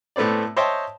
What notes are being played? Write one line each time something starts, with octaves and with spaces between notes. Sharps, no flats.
A2 A3 B3 C4 D5
C5 C#5 D#5 E5 G5 A5